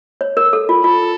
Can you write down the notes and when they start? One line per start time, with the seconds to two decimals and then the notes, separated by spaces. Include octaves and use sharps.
0.21 C#5
0.37 A#4
0.53 A4
0.69 F4
0.84 F4 A4